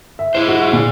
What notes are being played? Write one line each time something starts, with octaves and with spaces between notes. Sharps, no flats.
E5
E4 G#4 C5 E7
F#4
A#2